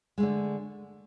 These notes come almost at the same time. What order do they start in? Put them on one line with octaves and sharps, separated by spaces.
G#3 A3 D3